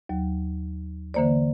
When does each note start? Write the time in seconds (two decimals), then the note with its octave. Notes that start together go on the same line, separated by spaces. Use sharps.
0.09 D#2 F#3
1.14 D3 E3 A#3 C5 D5